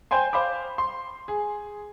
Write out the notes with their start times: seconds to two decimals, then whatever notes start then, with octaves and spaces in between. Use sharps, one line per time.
0.11 C5 G5 G#5 C6
0.33 C5 F5 B5 D6
0.78 C6
1.28 G#4